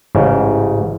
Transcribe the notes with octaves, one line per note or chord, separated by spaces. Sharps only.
A1 G#2 C#3